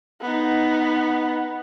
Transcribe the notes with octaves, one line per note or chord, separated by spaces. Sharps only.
B3 D#4